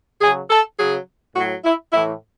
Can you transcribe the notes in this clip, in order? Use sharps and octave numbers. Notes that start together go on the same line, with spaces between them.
C#3 F#3 G#4
A4
C#3 F#3 G#4
A2 F#3 F#4
E4
A2 E3 E4